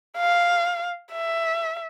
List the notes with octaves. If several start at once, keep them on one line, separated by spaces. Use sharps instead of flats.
F5
E5